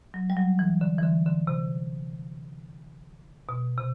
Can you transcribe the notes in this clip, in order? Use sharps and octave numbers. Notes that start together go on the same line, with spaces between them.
F#3
G3
F#3
E3
D3
E3
D3
D3
C3
B2
C3